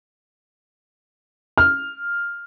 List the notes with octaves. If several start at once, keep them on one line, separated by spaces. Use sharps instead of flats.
F6